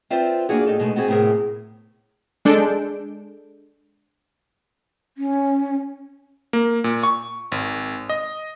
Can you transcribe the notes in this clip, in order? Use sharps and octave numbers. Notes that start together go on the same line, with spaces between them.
C4 F4 B4 C5 D5 E5
A#3 C4 D4 F4 F#4 G#4
A2 D#4 A4
B2 G#3 A3
B3 C4 F#4 G#4
A2 C3 B3 G#4 A#4
G#3 D4 A4 G6 D7
C#4
A#3
A#2
C#6
G#1
D#5